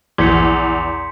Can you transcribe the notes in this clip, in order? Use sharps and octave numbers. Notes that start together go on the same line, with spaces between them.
A#1 E2 E3 C6 G#6 B6 C#7